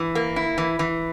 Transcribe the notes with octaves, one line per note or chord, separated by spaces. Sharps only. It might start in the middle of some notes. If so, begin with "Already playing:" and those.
Already playing: E3
A#3
E4
E3
E3